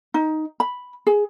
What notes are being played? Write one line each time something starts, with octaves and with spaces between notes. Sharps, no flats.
D#4
B5
G#4